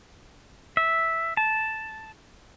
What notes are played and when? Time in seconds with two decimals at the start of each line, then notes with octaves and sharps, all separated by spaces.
0.77 E5
1.37 A5